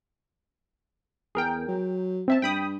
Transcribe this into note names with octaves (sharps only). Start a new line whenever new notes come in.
E2 G#4 A#4 G5
F#3
C4 E5 A5
G2 G5 B5 D#6